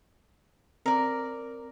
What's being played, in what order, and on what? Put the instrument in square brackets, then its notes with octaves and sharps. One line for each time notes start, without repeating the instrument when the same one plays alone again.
[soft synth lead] C4 [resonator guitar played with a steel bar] A#4 D5